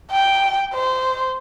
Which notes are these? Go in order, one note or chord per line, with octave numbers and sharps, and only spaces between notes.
G5
C5